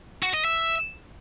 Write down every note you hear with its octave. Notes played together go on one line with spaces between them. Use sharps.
F#4
D#5
E5